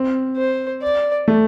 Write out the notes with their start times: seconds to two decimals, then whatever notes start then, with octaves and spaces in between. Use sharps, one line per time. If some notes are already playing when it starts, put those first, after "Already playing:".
Already playing: C4
0.37 C5
0.82 D5
1.28 A3